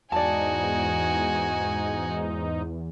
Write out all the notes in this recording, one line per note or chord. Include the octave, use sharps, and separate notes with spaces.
E2 G#2 D#4 F#4 D5 G#5 A5